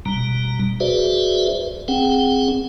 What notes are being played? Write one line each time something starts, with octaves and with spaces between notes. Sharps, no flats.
B2 G3 A#5
F#4 G#4 B4 C5 D5 E5
C4 G#4 F#5 G5